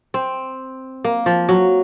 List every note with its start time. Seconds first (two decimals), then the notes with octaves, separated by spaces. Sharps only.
0.14 C4
1.04 A#3
1.26 F3
1.49 F#3